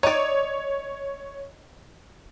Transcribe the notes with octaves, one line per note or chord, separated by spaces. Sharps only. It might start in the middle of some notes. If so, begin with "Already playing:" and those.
D#4 C#5 D5